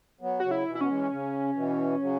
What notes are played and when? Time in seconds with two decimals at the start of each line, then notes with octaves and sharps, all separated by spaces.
0.21 F#3 B3
0.40 C#3 F#3 F#4
0.51 E4
0.66 B2 E3
0.75 E4
0.80 B3 C#4
0.88 E3 G#3
1.10 C#3
1.55 B2 E3
2.00 C#3 F#3